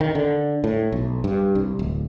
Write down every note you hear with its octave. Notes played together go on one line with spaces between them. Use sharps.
D#3
D3
A2
B1
G2
C2
D1